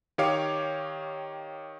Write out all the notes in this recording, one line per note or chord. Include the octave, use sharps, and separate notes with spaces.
D#3 G4 C#5 F5 D6